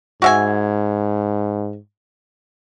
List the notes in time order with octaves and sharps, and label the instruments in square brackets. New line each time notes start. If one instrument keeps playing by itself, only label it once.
[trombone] G#2 [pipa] F#4 E5 G#5